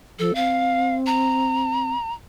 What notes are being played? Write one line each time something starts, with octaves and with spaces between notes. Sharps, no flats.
F3 A4
C4 F5
A#5